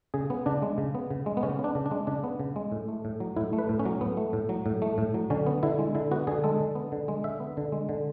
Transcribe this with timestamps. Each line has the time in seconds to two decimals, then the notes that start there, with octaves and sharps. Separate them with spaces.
0.14 C#3 G#4
0.30 B3
0.46 C#3 D4
0.62 G#3
0.78 C#3
0.95 B3
1.11 C#3
1.26 G#3
1.37 B3
1.43 C#3 C#4
1.59 B3
1.64 D4
1.75 C#3
1.86 D4
1.91 G#3
2.07 C#3 D4
2.24 B3
2.40 C#3
2.56 G#3
2.72 A2
2.88 A3
3.05 A2
3.20 F#3
3.36 A2 E4
3.53 A3
3.58 B4
3.69 A2
3.79 C#4
3.85 F#3
4.01 A2 B3
4.17 A3
4.33 A2
4.49 F#3
4.66 A2
4.82 A3
4.98 A2
5.14 F#3
5.30 D3 C#4
5.46 B3
5.63 D3 E4
5.79 G#3
5.95 D3 E4
6.11 B3 F#4
6.27 D3 G#4
6.44 G#3 A4
6.60 D3
6.75 B3
6.92 D3
7.08 G#3
7.24 D3 E5
7.40 B3
7.57 D3
7.72 G#3
7.89 D3